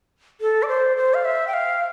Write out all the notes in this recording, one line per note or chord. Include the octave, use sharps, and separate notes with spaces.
A4
D5
C5
C5
F5
E5
G5
F5